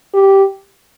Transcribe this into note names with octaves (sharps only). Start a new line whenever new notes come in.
G4